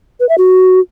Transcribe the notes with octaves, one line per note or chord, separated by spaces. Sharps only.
B4
E5
F#4